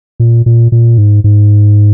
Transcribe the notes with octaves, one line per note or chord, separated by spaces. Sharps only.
A#2
A#2
A#2
G#2
G#2